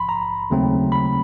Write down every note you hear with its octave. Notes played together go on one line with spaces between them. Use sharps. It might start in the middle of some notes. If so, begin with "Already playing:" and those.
Already playing: A#1 G#2 F3 B5 C6
A#5
D#2 C#3 F#3 A3 C4
B5